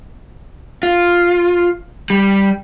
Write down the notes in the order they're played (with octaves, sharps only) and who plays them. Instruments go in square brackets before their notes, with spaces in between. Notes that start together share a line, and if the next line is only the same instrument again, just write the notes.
[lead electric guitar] F4
G3